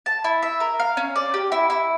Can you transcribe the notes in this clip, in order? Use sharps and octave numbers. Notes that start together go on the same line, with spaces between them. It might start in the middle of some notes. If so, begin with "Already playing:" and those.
A5
E4
E5
A#4
F5
C#4
D5
G4
E4
E4